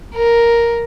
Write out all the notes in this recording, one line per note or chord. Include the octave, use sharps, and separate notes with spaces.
A#4